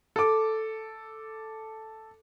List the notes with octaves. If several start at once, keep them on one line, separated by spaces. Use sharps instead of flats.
A4 D6